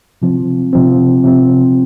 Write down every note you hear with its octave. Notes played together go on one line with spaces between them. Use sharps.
C3 F3 C4
C3 F3 C4
C3 F3 C4